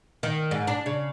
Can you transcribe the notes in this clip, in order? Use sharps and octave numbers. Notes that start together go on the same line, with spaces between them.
D#3
G#2
D4
C#3